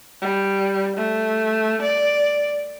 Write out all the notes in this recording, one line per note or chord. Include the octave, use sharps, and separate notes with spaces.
G3
A3
D5